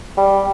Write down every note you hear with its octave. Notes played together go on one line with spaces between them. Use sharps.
G3